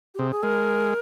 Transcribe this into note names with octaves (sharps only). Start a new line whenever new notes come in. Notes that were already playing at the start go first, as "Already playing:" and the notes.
G4
C3 G#4
G#4
G#3 A#4